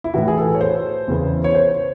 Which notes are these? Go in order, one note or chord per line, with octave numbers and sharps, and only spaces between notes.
E4
A2 E3 F#4
G#4
A4
C#5
C5
E2 C#3 E3
C#5
C5